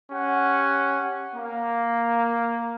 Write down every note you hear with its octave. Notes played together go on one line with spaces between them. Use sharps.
C#4 G4 F#5
A#3